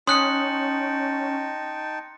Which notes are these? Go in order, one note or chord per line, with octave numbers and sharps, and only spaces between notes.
C#4 D#4 G5 A5 C6 D#6 F#6 C#7